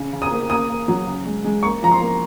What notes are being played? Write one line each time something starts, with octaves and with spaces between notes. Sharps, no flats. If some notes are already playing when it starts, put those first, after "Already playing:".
Already playing: C#3
C#3
D#6
A#3
A#3 D#6
A#3
F#3
C#3
G#3
G#3
A#3 C#6
F3 A#5
C6
A#3